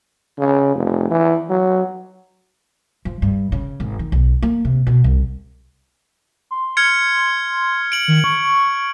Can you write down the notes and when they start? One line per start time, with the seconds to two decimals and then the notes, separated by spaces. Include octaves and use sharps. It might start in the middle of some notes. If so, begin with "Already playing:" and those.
0.38 C#3
0.75 F1
1.11 E3
1.49 F#3
3.05 F3
3.22 G2
3.52 C#3
3.80 G#1
3.99 D#3
4.12 B1
4.42 A#3
4.65 C3
4.87 B2
5.04 C2
6.51 C6
6.77 F6 G#6 C#7
7.92 D7 F#7
8.08 D#3
8.24 C#6